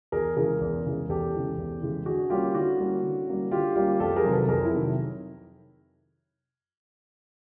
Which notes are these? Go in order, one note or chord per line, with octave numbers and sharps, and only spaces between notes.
E2 G#4 A#4
C#3 E3 G#3 G#4 A#4
E2
C#3 E3 G#3
E2 G4 A4
C#3 E3 G#3
E2
C#3 E3 G#3
D3 F#4 G#4
G3 A#3 C#4 F4 G4
D3 E4 F#4
G3 A#3 C#4
D3
G3 A#3 C#4
D3 F4 G4
G3 A#3 C#4 F4 G4
F2 G4 A4
G#4 A#4
C3 D#3 F#3
A4 B4
F2 G#4 A#4
E4
C3 D#3 F#3